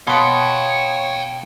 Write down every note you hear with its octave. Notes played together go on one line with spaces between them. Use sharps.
B2 B3 C#5 F5 G5 C6 D#6 C#7